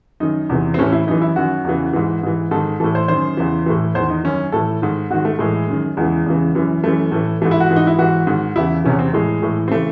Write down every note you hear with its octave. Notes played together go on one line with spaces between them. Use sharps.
F#2 D#3 D#4
E2 C3 E3
C4
A2 E3 C#4
E4
F#2 E3 D#4
E4
F#2 D#3 F#4
E2 C#3 E3
G#2 E3
G#2 E3
G#2 D#3 A4
A2 E3 A4
C5
F#2 D#3 C5
E2 C#3 E3
A2 E3
E2 C5
D#3
D#4
F#2 D#3 C#4
A2 E3 A4
G#2 D#3
G#2 D#3 F#4
A3
A2 E3 G#3
F#2 D#3
E2 C#3 E3 G#3
E2 C#3 E3
F#2 E3
F#2 E3 A3
A2 E3
G#2 E3 A3
E4
F#4
G#2 E3
D#4
E4
G#2 E3 F#4
G#2 D#3
E2 C#3 E3 E4
E2 C3 E3 C#4
C4
A2 E3 G#3
A2 E3
C4
C#3 E3 A3